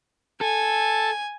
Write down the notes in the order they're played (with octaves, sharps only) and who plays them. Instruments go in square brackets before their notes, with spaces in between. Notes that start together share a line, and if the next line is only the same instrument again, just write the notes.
[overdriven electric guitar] A4 [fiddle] G#5